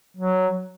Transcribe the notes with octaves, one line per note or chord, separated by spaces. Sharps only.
F#3